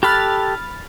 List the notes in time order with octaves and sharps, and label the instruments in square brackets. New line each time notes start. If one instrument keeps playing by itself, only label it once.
[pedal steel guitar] G4 A4 F#6 [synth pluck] B5 F6 A6